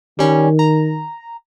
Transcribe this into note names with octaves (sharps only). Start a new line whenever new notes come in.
D#3 G3 C#4
A#5